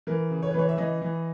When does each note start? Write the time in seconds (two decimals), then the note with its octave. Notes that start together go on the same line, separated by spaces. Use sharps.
0.07 E3 A#4
0.30 C#3
0.42 C#5
0.51 B4
0.54 E3 C#5
0.69 E5
0.78 E3 D#5
1.02 E3